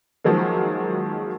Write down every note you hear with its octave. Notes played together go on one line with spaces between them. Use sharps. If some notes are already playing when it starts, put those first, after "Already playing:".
D#3 F3 F#3 G#3 A#3